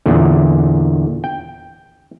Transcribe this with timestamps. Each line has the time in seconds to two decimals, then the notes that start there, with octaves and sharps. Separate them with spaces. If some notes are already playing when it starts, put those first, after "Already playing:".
0.06 E2 A#2 D3
1.24 G5